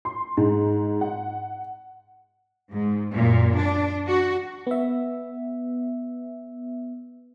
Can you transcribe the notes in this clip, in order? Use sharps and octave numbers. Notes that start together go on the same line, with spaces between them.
C6
G#2
F#5
G#2
F#2 A#2
D4
F#4
B3 E5